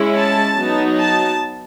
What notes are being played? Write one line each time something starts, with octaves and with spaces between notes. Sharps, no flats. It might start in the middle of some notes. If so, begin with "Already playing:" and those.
Already playing: G#3 C#4 E4
A5
F#3 B3 D#4
A5